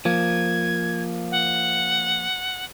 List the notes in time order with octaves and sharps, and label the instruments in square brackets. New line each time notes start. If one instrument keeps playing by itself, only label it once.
[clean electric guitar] F3 A#3 [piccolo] G#6
[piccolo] F#5